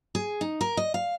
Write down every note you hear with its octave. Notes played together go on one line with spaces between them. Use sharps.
G#4
D#4
A#4
D#5
F5